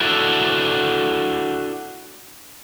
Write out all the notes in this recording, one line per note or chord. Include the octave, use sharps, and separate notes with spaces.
D4 E4 F#4 A4